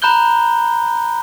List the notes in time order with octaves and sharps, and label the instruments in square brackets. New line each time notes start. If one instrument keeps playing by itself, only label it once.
[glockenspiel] A#5 B5 F#6 G6 G7